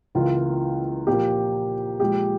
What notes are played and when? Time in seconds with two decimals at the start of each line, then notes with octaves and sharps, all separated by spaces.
0.15 C#2 C#3 E3 A#3 F4
1.07 A#2 F3 A#3 G4
2.00 A#2 F3 G#3 G4